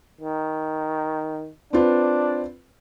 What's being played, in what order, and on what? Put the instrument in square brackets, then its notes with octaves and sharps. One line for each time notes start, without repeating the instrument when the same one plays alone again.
[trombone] D#3
[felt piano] C4 F4 B4 [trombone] D4